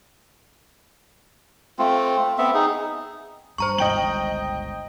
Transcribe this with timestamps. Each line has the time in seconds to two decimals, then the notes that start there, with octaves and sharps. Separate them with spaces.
1.79 A3 C4 F4
2.38 B3 C4 E5
2.54 D#4 G#4
3.58 G2 C5 A#5 C#6
3.78 G1 C#2 D#5 G5 F#7